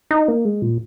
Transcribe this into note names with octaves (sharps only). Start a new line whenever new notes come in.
D#4
A#3
G#3
A#2